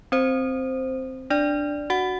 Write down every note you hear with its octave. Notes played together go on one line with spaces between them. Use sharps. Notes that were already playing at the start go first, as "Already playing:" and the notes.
C4 C5
D4 D5
F#4 F#5